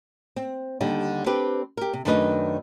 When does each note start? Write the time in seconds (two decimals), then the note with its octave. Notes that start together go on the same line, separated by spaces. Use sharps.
0.36 C4
0.80 D#2 D3 G3 D#4
1.26 C4 D4 G4 B4
1.77 G4 A#4
1.93 C3
2.05 F#2 D#3 A3 D4 B4 D#5